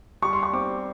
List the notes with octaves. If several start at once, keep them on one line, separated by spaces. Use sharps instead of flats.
G3 C#6
C6
C#6
C4 D6